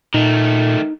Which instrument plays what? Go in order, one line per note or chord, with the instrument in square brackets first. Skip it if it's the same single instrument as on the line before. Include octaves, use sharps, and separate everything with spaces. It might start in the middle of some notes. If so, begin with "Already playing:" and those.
[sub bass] A#2 [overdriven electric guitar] D#3 A3 [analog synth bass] D#4